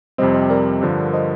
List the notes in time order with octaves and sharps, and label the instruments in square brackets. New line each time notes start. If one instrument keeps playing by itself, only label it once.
[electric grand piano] F2 C3 G3 C4 [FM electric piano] C5 D#5
[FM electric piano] C5 D#5
A#4 D5
[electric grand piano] G2 D3 F3
[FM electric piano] C5 D#5